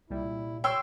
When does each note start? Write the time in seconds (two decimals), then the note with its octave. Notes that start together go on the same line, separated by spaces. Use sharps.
0.10 C2 A#2 G3 E4
0.64 C#5 G5 C6 E6